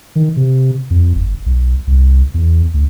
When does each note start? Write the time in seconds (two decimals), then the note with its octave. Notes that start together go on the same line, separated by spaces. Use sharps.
0.16 D#3
0.37 C3
0.90 F2
1.15 G1
1.46 B1
1.87 C2
2.34 E2
2.74 D2